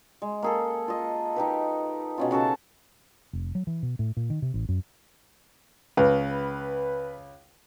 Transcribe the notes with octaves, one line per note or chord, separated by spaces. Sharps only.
G#3
A#3 G#4 A4
F4 D#5
D#4 G4 B4
B2 C#4 F4
C#3 F#4 A4 A5
F1
F#3
E3
B2
A2
A#2
D#3
C3
A1
F#2
C#2 B4